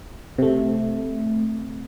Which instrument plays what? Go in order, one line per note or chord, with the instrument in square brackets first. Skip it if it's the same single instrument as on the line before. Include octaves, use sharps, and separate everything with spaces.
[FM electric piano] C3 A3